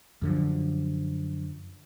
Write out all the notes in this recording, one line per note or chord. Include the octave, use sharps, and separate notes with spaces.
F#2 D3 F3